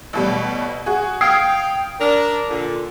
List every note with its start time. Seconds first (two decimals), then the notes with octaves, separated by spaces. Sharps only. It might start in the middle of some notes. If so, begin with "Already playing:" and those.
0.13 A1 B2 G3
0.86 F#4 G#4
1.21 F5 G5 D#6 G#6 C7
2.01 D4 A#4
2.50 A#2 D3